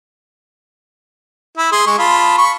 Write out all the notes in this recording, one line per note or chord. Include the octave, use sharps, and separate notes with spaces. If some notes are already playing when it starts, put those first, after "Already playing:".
E4
G#4 C6
G#3 C#6
F4 A5 B5
B5 C#6